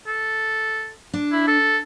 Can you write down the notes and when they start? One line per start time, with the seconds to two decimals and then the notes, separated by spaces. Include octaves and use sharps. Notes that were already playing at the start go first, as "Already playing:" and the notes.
0.07 A4
1.14 D4
1.32 E4
1.47 A4